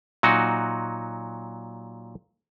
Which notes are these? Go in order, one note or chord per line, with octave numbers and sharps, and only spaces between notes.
A#2 F#3 D#4 F#4